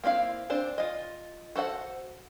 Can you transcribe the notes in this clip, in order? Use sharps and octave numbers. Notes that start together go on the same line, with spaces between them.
A#3 C4 E4 F5
C4 D4 C5
F4 D#5
F#4 A4 C5 F#5